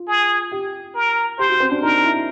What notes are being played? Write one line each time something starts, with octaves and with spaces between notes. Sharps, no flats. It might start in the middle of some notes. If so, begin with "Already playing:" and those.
Already playing: F4
G#4
G4
A#4
G4 C5
F#4
C4
D4
D#4 A#4
E4